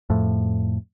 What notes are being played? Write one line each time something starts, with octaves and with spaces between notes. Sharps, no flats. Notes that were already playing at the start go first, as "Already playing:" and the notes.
F2 A2